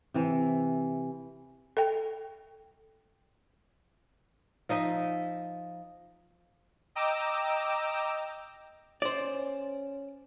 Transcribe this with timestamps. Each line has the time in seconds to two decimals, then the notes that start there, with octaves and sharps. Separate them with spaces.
0.14 C3 E3
1.77 A4 G5
4.69 F3 D#4 D#5 E5
6.95 D#5 G5 A#5 D6 E6
9.02 C#4 C5 D5